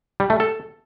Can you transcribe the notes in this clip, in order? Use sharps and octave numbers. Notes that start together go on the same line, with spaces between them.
G3
A3
A4